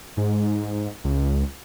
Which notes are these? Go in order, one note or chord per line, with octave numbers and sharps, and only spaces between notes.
G#2
C#2